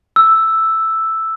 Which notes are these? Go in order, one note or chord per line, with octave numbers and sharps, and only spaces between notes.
E6